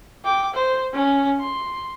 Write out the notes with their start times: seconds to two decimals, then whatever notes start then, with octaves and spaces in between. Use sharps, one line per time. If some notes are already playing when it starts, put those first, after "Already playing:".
0.25 G5 D6
0.54 C5
0.93 C#4
1.40 C6